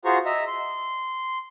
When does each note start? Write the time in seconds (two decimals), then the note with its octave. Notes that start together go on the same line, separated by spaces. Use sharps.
0.05 F4 F#4 G#4 C5 A#5 C#6
0.26 D#5 E5 A#5 E6
0.47 C6